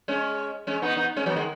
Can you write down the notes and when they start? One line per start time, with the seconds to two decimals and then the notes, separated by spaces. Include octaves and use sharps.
0.08 G#3 C#4
0.67 G#3 C#4
0.82 B3 D#4
0.97 B3 D#4
1.16 G#3 C#4
1.26 F#3 B3
1.36 D#3 G#3